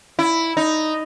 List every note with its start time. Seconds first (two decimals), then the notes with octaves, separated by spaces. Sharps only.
0.19 E4
0.57 D#4